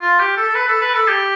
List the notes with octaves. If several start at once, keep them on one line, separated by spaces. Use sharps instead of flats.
F4
G4
A4
A4
B4
A4
B4
A4
G4